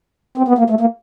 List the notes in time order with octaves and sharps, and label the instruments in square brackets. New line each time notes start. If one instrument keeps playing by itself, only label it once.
[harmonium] C4
B3
A#3
A3
A#3